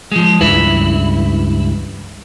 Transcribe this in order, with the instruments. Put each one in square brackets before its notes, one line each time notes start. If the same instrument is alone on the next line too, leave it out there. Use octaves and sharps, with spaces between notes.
[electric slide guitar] F3 G#3
[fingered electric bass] C#2 G2 E3 [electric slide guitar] E4